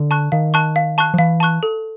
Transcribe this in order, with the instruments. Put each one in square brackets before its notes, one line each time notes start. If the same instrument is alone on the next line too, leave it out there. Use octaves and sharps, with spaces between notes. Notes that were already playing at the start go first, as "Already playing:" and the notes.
Already playing: [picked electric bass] D3
[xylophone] A5 C#6 F#6
[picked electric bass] D#3 [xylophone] F5
[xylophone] A5 C#6 F#6
F5
A5 C#6 F#6
[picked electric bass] F3
[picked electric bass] E3 [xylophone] F5
[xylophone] A5 C#6 F#6
A4